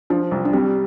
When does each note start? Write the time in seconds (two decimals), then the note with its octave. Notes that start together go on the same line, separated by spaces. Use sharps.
0.10 F3 D4
0.31 C2
0.45 D4
0.53 G3 C4